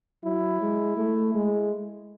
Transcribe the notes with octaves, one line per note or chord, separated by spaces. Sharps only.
F#3 E4
G#3
A3
G#3